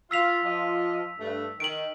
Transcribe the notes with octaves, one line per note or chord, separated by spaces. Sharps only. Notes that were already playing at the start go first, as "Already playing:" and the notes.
F4 E6 B6 F7
F3 F4 D#5
G2 A3
D#3 D7 F#7